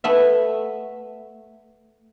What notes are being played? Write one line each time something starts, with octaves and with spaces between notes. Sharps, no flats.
A3 B3 E5